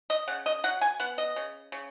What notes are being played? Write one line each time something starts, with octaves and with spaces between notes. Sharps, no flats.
D#5
C#3 F#5
D#5
F#3 F#5
G#5
B3 F#5
D#5
C#3
C#3